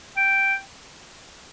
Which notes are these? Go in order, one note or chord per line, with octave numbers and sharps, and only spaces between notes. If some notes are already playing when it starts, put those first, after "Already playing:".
G5